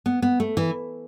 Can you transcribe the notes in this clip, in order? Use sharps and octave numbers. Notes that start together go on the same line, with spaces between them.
B3
B3
A3
E3